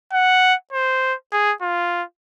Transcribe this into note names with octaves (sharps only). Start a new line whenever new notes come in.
F#5
C5
G#4
F4